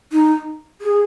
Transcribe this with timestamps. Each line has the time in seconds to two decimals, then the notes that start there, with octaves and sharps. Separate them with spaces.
0.12 D#4
0.81 G#4